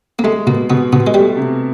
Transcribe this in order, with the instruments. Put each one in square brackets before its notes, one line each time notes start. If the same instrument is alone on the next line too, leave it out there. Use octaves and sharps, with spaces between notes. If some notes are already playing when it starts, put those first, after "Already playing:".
[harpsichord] A#3
[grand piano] G#3 [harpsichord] A3
[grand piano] B2 [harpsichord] A#3
[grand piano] B2 [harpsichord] B3
[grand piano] B2 [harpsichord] B3
[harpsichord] G#3
[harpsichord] G3 [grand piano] A3
[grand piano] C3